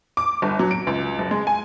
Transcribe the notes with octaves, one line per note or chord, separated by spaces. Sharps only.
D6
G1
F#3
D7
C#2
F#1
G#3
G#5